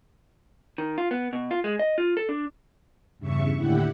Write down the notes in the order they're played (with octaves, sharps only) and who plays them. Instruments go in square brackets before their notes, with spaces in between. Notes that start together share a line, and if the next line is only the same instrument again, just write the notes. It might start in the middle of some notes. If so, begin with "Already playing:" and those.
[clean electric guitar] D#3
F4
B3
B2
F4
G#3
D#5
F4
A4
D4
[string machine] E2 G2 C#3 E5 C#6
D#2 A2 D3 E4 G4 F#5